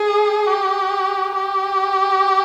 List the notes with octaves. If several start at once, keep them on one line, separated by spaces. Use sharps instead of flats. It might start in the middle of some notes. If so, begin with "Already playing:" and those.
Already playing: G#4
G4
G4